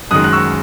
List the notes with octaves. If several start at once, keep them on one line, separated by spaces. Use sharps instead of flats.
F#2 D#3 G#3 D#6 F#6
F#6
C#6 E6